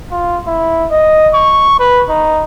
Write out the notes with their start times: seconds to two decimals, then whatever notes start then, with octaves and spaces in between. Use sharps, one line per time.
0.12 F4
0.47 E4
0.91 D#5
1.34 C#6
1.80 B4
2.10 D#4